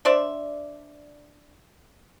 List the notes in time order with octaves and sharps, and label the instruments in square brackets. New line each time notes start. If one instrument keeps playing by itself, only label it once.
[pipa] D4 C5 D5 E5